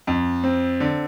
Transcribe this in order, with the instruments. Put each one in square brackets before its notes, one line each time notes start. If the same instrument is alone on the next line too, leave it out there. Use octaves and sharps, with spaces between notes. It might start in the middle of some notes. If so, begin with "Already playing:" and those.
[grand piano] F2
C4
D3